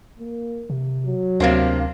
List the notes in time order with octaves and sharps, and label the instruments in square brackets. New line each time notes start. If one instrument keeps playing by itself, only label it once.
[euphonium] A#3
[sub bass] C3
[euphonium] F#3
[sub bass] D2 [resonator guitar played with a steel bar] C3 A#3 D4 [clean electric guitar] C5 F5